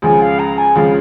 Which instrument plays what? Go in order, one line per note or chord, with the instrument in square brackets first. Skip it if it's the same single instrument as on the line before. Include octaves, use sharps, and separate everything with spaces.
[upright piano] C#2 C#3 F3 [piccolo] G#5
[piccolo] F5
A#5
G#5
[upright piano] C#2 C#3 F3 [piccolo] F5